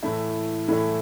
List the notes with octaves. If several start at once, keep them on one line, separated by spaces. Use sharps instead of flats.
A2 E3 A3 E4
A2 E3 A3 E4